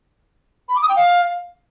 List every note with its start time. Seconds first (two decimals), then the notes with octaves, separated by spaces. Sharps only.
0.69 B5
0.76 D6
0.82 D#6
0.89 G5
0.96 F5